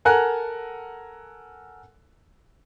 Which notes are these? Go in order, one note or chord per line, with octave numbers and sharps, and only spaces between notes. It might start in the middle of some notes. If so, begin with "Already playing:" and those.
A4 A#4 F#5 G#5 A#5 F#6